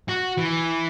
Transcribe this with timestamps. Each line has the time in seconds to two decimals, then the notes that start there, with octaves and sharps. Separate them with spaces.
0.08 F#4
0.38 E3